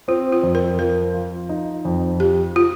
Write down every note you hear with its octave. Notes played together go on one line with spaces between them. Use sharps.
C4 F4
F4
F2
A#4
F3 A#4
F4
D#4
F2
F3 G4
F4